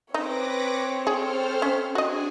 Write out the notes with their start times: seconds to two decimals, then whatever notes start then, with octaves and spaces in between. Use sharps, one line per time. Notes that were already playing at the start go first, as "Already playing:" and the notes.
0.14 C4 D#4 B4 C#5 D6 A#6
1.07 G#4 A4 C5 F6
1.62 C#4
1.95 D4 F#4 G#4 D#5 G#5